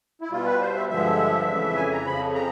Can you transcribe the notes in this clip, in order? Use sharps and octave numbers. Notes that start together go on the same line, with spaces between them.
E4
B2 G3 F4
B4
C5
E5
G2 D3 F3 G#3 E5
F2 C#3 E3
G#5
A#5
F2 C#3 F3 B5
A#5